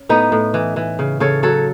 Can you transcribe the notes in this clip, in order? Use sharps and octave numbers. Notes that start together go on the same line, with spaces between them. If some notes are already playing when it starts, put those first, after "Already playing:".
Already playing: C#4
A2 B3 D#4
A2
E3
E3
C#3
C#3 A4 C#5
F#3 A4 C#5